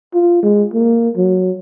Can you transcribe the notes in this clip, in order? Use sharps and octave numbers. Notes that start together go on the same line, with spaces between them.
F4
G#3
A#3
F#3